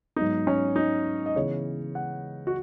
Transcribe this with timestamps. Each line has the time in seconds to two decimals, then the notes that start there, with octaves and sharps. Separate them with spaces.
0.16 G#2 F#3 B3 D#4
0.47 C#4
0.76 D#4
1.26 D#5
1.36 C#3 E3 B3 C#5
1.95 F#5
2.47 F#4